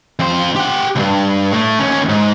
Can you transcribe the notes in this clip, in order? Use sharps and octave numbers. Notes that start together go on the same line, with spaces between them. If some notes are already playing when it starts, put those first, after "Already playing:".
F2 C5
G4 F#5
C#2 G2
A2 A3
D#2 C#4
G#2